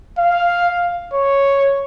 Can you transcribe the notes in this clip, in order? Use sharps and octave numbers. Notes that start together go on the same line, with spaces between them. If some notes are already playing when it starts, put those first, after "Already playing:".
F5
C#5